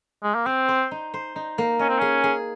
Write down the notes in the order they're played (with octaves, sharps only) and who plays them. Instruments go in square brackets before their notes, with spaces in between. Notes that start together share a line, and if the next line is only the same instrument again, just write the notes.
[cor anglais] G#3
A#3
[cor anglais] C4 [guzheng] C5
[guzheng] C5
D#4
C5
D#4
A#3
[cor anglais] C#4 [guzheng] D#5
[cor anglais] C4
[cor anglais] C#4 [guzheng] G#4
[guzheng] G#4